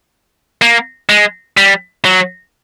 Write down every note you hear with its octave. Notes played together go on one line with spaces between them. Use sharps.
A#3
G#3
G3
F#3